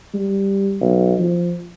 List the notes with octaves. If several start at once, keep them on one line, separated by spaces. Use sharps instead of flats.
G3
B1
F3